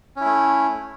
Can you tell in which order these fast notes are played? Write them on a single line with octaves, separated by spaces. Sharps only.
C#4 E4 A3